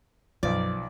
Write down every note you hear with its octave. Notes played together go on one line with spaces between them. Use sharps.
B1 F#2 F3 D5